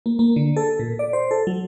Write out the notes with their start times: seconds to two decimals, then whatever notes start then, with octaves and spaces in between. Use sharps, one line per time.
0.06 A#3
0.19 A#3
0.36 D3
0.56 A4
0.79 A#2
0.99 D5
1.13 C5
1.31 A4
1.47 F#3